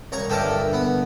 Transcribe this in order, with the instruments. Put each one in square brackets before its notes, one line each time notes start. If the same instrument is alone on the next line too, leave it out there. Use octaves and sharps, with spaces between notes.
[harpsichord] C2 C#5 A#5
[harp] G1 E5 [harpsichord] G4 A4 A#4
[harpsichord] B3